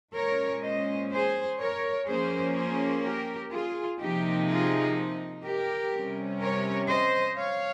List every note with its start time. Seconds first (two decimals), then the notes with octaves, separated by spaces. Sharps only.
0.15 A#2 G#3 C#4 A#4 C#5
0.63 C5 D#5
1.11 G#4 C5
1.59 A#4 C#5
2.07 F3 A#3 C#4 G#4 C5
2.56 G#4 C5
3.04 G4 A#4
3.52 F4 G#4
4.00 C3 F3 A#3 D#4 G4
4.49 F4 G#4
5.44 G4 A#4
5.93 C3 G3 C#4
6.41 A#4 C#5
6.89 C5 D#5
7.37 C#5 F5